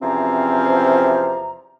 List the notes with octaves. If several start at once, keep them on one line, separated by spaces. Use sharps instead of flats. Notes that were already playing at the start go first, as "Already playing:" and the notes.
E2 C3 F3 C4 C#4 A#5